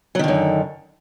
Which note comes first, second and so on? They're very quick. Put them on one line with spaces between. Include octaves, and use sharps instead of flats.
F#3 D#3 D3 F#2